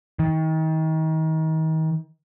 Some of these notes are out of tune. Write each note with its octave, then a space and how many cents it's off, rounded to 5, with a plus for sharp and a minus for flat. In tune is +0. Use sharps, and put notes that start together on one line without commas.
D#3 +35